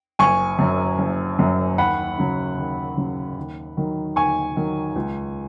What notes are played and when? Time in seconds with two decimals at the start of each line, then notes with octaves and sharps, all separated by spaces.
0.19 F#1 G#5 C#6
0.59 F#2 F#3
0.99 F#1
1.39 F#2 F#3
1.78 D#2 F#5 B5
2.18 C#3 F#3
2.57 D#2
2.97 C#3 F#3
3.37 D#2
3.77 D#3 F#3
4.16 D#2 G#5 C#6
4.56 D#3 F#3
4.96 C#2